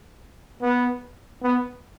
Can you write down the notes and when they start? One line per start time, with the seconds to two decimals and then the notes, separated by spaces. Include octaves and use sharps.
0.62 B3
1.42 B3